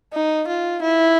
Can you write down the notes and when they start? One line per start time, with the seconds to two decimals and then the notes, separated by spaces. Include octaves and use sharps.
0.13 D#4
0.48 F4
0.82 E4